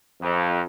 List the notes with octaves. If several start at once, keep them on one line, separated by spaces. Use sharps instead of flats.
F2